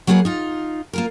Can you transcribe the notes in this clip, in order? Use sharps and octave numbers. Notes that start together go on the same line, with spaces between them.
F#3 A#3 B3 F#4 G#4 B4
D#4 F4
A#3 F4 A#4